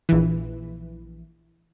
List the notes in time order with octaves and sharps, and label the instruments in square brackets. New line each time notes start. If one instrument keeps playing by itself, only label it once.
[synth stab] A#1 E3